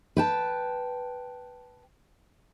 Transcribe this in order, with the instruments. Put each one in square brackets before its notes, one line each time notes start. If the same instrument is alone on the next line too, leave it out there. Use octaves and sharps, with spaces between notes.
[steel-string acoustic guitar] B4 G5 A5